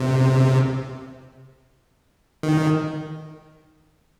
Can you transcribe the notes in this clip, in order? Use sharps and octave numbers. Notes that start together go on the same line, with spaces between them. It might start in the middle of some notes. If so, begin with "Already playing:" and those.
Already playing: C3
D#3